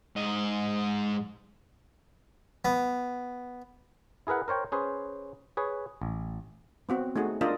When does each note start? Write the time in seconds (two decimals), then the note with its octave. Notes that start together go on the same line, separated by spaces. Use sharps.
0.16 G#2 D#5
2.65 B3
4.27 E4 G#4 A#4 B4 F#5
4.48 A#4 C5 C#5 G5
4.72 C#4 G#4 B4 C5
5.57 G#4 B4 C#5
6.02 A1
6.89 B3 C4 F#4
7.16 A3 D#4 F#4 G#4
7.41 D4 F4 A#4 D5 D#5